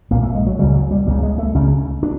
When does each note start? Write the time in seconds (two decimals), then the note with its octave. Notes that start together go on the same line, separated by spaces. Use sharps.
0.11 B1 A#2 A#3
0.23 A3
0.35 G#3
0.47 F#3
0.59 C#3 G3
0.63 C#2
0.75 F#3
0.91 G3
1.07 C#2 C#3 G3
1.23 G#3
1.38 A3
1.55 C#2 C#3 C#4
2.03 D4